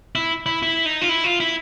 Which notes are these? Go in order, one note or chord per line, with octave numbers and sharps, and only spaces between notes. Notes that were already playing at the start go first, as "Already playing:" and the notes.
E4
E4
E4
D#4
F4
E4
F4
E4